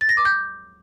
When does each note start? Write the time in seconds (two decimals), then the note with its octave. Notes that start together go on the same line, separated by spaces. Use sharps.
0.01 A6
0.09 A#6
0.17 D6
0.25 G6